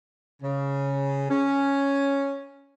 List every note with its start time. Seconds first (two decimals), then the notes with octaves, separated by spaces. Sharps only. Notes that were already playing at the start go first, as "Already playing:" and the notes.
0.42 C#3
1.29 C#4